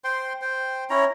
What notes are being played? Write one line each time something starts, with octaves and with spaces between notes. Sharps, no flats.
C5 G5 C6
C5 G5
C#4 E4 C#5 A#5